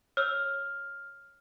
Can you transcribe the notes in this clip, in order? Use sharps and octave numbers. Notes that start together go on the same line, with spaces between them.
C#5 E6 F6